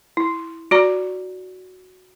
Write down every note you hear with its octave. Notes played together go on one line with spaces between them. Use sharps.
E4
F#4 D5 A#5